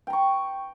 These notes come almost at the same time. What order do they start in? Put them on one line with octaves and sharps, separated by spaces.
G5 A#5 C#6